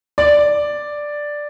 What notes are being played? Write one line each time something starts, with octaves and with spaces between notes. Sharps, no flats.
D5